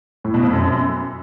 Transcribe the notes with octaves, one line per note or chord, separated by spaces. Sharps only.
A2
B2
F2
F#2